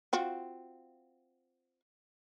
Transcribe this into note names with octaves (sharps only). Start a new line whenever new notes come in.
C4 F4 F#4